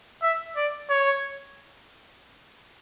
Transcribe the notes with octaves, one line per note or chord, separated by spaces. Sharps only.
E5
D5
C#5